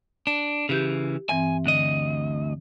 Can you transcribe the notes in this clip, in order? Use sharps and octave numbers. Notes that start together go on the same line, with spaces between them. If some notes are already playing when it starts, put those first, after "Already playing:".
D4
C#3 E3 G4 G6
G2 E3 C4 G#5
D2 D3 D#5